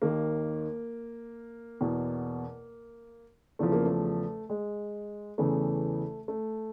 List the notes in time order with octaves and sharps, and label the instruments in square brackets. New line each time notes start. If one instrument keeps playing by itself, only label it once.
[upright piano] D#2 D#3 A#3
E2 B2
E2 C#3 F3 A3
A#3
A3
G#3
E2 C#3 E3 A3
A3